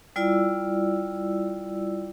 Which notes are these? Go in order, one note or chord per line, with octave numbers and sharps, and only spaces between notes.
G3 E4 F4 D5 E6